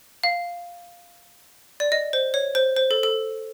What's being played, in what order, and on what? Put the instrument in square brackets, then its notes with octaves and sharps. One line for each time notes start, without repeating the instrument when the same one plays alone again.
[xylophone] F5
D5
D#5
C5
C#5
C5
C5
A4
A4